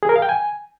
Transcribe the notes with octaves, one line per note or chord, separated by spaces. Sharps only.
G#4
A#4
F5
G5
G#5